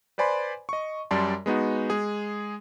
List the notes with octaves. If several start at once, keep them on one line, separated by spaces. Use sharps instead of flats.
B4 C5 D5 G#5 B5 C6
D#5 C#6
F#2 G3 D5 A5 C6
G#3 B3 D#4 F#4
G#3 G#4